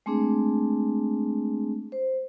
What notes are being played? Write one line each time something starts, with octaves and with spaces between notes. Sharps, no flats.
G#3 A3 C4 D4 G#4
C5